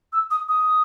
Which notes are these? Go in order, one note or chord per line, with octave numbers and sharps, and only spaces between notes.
E6
D#6
D#6